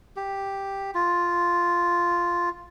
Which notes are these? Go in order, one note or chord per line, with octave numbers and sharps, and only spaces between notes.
G4
F4